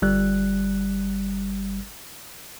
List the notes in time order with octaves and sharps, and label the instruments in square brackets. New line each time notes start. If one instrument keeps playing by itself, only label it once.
[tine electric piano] G1 G3 F#6